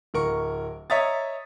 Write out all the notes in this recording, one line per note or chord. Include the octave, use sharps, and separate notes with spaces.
D1 A#4 C#6
C#5 D#5 E5 A#5 D#6 A6